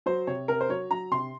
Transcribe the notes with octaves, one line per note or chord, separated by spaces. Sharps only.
F#3 C5
C3 C#5
C3 A#4
C5
F#3 C#5
F#3 A#5
C3 C6